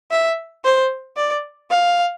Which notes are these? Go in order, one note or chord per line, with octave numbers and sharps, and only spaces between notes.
E5
C5
D5
F5